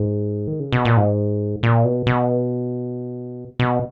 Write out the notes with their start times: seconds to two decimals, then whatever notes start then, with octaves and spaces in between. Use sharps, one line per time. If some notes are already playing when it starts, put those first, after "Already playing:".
Already playing: G#2
0.47 D#3
0.60 C#3
0.72 B2
0.85 A#2
0.97 G#2
1.63 A#2
1.85 B2
2.07 B2
3.60 B2